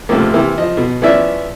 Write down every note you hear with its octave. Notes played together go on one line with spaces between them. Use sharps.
C#2 G#2 C3 F3 A3 A#3
C3 E3 A#3
F3 D#5
B2
F3 B3 C#4 E4 D5 E5